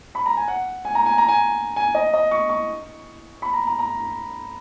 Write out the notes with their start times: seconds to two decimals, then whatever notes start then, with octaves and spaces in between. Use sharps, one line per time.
0.15 B5
0.26 A#5
0.37 G#5
0.48 F#5
0.85 G#5
0.95 A#5
1.06 G#5
1.18 A#5
1.28 G#5
1.76 G#5
1.95 D#5
2.14 D#5
2.31 C#6
2.49 C#6
3.42 B5
3.53 A#5
3.67 A#5
3.79 A#5